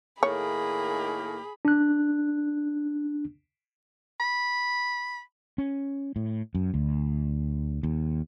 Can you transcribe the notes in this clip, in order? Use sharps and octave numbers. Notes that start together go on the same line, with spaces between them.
A2 D#3 A#3 G#4 C#5 B5
D4 F#6
B5
C#4
A2
F#2
D2
D#2